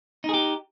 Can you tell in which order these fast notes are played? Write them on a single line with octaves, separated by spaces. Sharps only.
D#4 G#4 G4